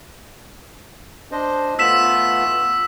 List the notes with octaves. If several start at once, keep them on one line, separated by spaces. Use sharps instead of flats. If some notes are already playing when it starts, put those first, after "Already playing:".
D4 C5 D#5
A3 B3 F4 E6 B6 E7